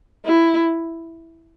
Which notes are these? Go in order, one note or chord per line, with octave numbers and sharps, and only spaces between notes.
E4